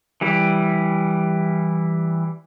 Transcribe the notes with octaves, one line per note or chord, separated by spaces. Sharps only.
E3 G3 E4